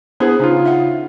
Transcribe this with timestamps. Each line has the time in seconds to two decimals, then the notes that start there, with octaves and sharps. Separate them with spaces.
0.20 B3 D4 E4 G#4 C5
0.40 C#3 D#4 F4
0.65 E5 F#5